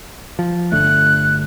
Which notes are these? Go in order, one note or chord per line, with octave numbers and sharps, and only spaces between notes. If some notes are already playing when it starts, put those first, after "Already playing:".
F3
G1 D3 A3 F#6